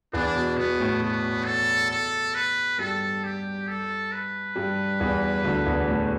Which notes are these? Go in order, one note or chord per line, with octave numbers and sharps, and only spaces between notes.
E2 E3 D4
B2
B2 B3
A2
B2 B3
A4
A4
B4
G2 G3 A4
G4
A4
B4
G2 G3
E2 E3
D2 D3
E2 E3
A2 A3